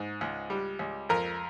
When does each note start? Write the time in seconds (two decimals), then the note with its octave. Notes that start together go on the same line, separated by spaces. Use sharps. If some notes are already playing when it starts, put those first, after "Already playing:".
Already playing: G#2
0.21 C#2
0.50 G3
0.79 C#2
1.09 F2 A#4